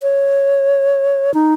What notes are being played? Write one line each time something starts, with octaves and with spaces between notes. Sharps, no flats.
C#5
D#4